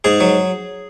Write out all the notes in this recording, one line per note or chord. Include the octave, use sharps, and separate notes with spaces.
G#2 G#4
F#3